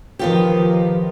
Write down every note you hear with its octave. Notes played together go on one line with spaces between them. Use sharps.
D#3 F3 B3 F4 G4